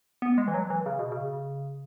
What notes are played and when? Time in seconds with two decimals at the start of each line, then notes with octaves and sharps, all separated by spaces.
0.22 B3
0.38 G#3
0.48 E3
0.54 F#3
0.70 E3
0.86 C#3
0.99 B2
1.12 C#3